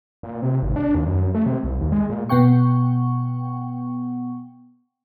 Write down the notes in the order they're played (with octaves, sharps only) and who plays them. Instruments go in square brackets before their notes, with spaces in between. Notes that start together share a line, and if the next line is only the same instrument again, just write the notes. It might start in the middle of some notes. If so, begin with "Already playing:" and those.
[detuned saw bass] A#2
C3
G#1
D4
D#2
F#2
A3
C3
C2
D#2
G#3
A#2
[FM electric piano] B2 B3 F#5 G5 C#6